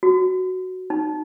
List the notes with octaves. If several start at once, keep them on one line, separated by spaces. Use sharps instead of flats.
F#4
D#4